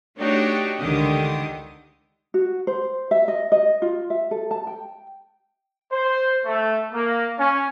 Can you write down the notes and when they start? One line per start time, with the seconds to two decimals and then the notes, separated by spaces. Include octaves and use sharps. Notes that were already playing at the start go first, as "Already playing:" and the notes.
0.18 A3 D4 D#4 F#4 G4 C#5
0.79 C#2 D3 D#3 G4 D#6
2.34 F#4
2.67 C5
3.11 E5
3.28 D#5
3.52 D#5
3.82 F4
4.10 E5
4.31 A4
4.51 A5
4.67 G5
5.92 C5
6.45 A3
6.93 A#3
7.39 C#4